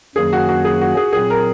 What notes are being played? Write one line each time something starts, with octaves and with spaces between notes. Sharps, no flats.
F#2 D#3 F#3 A#3 C#4 G#4
F#4
F#4
G#4
F#4
G#4
A#2 F#3 C4 G#4
A#4